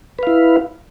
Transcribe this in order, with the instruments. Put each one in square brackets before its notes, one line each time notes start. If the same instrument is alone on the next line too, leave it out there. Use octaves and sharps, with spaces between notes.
[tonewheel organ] B4
F5
E4